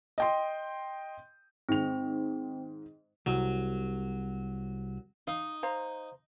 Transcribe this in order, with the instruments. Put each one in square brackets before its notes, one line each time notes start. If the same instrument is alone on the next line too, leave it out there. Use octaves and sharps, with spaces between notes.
[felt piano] D#5 G5 C6
[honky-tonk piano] G#2 D#3 F7 [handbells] C4
[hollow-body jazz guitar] C2 [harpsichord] F#3
[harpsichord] D#4 [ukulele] F5
[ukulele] C5 F5 A#5